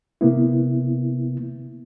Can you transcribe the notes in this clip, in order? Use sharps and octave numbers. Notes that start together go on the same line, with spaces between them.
C3 A#3 B3 E4